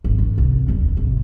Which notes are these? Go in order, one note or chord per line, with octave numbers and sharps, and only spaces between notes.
G#1
E3
C2
E1 D2
G#1 C3